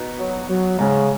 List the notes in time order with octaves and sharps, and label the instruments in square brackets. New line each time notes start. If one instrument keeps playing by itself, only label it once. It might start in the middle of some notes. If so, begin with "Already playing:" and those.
Already playing: [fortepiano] B2 B3 D#4
[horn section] F#3
F#3
[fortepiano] G#2 G#3 C#4 [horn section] C#3